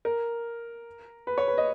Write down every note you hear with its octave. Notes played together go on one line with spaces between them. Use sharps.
A#4
B4
C#5
B4
D#5